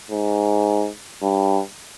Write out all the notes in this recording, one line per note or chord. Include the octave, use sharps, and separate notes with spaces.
G#2
G2